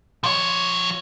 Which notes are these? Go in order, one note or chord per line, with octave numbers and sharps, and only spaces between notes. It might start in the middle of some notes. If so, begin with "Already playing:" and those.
F3 C#5